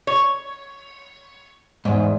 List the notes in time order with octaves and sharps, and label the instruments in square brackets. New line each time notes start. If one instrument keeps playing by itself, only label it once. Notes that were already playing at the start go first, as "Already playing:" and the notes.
[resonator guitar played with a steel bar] C#5
[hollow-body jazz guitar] E2 G#2